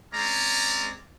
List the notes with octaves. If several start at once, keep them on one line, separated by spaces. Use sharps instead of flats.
G#3 C4 C#4 D5 A#5